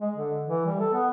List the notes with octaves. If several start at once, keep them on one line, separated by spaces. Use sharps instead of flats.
G#3
D3
E3
G3
A4
B3